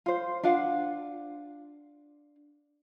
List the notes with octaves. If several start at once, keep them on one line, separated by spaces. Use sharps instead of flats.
F4 C5
D4 F4 F5 F#5